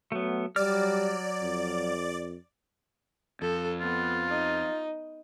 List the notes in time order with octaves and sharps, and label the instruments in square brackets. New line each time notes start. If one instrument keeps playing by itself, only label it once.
[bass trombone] F#3 [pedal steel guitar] A3 B3
[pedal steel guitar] F#3 F6 [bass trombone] G3 [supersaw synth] D5
[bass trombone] F2
[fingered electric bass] F2 [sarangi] A4
[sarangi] B3 [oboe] F4
[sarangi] D#4